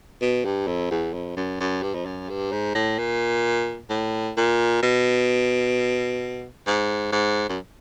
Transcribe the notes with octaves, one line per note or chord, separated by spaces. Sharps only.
B2
G2
F2
E2
F2
F#2
F#2
G2
F2
F#2
G2
G#2
A2
A#2
A2
A#2
B2
G#2
G#2
F#2